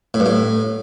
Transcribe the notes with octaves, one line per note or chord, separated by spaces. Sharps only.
A2
G2
A2